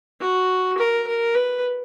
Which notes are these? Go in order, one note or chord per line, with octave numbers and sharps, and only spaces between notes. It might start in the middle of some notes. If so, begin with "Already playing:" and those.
F#4
A#4
A#4
B4